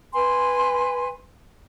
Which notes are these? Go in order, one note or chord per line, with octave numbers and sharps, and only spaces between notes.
B4 G#5 C6